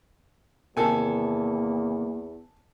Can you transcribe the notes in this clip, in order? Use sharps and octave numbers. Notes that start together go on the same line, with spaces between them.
E2 C3 D#3 A#3 A4 G#5